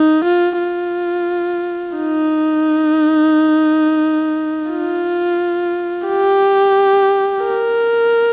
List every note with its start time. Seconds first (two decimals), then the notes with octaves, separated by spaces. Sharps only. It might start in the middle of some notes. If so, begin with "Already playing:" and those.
Already playing: D#4
0.24 F4
0.59 F4
1.97 D#4
4.71 F4
6.08 G4
7.44 A#4